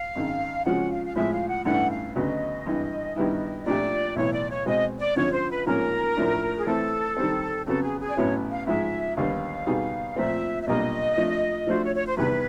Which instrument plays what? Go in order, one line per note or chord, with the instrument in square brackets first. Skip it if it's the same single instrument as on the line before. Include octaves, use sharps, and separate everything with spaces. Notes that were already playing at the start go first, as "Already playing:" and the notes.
Already playing: [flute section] F5
[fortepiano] G#1 F#2 D#3
[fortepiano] C#3 F3 G#3 C#4 F#4 [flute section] F#5
[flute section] F5
F5
[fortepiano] A2 F3 G#3 [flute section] E5
[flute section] F5
F#5
[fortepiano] A1 G2 E3 A3 D4 [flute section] F#5
[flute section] F5
[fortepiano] D2 C#3 F#3 B3 [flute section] D#5
[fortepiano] G#1 G2 E3
G2 D#3 G3 B3 E4
[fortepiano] A#2 F3 A3 D4 G4 [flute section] D5
[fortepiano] B1 A2 E3 [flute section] C#5
[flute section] D5
C#5
[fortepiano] B2 G#3 C4 [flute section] D#5
[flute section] D5
[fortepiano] G#1 F#2 D3 F3 [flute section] C#5
[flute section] C5
B4
[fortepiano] A1 G#2 F3 A#3 C#4 [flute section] A#4
[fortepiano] A2 F3 A3 D4
[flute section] G#4
[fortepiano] E3 A3 C4 [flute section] A4
[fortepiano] D#3 G3 C4
[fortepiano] F2 C#3 F#3 B3 [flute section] A4
[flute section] G#4
G#4
D5
[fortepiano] A1 A2 F#3 B3 E4 [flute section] C#5
[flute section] F5
[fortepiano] G#2 F3 G#3 [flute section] E5
[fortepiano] D#2 D3 G3 B3 [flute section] F5
[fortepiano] B2 G3 B3 D#4 G#4
[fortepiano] A#2 F3 A3 C4 [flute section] E5
[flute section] E5
[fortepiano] B1 A#2 G3 A#3 D4 [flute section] D#5
[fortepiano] F3 A3 D4
[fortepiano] F3 A3 D4 F#4 [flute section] C5
[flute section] C#5
C#5
C5
[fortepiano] E2 C3 D#3 G3 B3 [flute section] B4